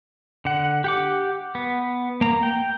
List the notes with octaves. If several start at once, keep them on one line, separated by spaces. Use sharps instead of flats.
D3 F#5
G4 F#5 D6
B3
A#3 A#5
G5